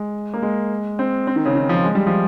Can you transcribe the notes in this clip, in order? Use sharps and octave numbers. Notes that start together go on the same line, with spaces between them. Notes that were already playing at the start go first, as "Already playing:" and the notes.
Already playing: G#3
A#3
G#3
C4
C4
D#3
C#3
D#3
F3
G#3
G3
F3